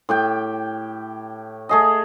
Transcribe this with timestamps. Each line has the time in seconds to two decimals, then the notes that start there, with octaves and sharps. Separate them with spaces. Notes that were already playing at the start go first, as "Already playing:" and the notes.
0.09 A2 G4 G5
1.69 A3 G#4 D#5